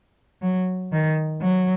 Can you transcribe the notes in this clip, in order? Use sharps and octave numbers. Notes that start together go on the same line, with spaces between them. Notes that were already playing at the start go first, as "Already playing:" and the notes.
F#3
D#3
F#3